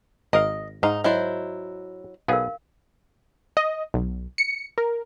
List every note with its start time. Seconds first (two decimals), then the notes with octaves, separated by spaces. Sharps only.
0.33 G#1 A#4 D#5 F5
0.83 G#2 D#4 F5
1.04 F#3 E4 C5 D#5
2.28 B1 B3 G#4 A#4 F5
3.57 D#5
3.94 B1
4.38 C#7
4.78 A#4